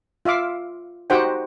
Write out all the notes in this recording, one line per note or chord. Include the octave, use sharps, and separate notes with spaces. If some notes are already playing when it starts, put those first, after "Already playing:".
F4 E5 F5 D6
D#4 F#4 G4 C5 F#5 G5